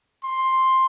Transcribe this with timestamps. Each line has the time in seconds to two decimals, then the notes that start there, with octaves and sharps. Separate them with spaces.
0.24 C6